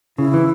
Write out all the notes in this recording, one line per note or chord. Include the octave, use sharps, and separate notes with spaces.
C#3 E4
E3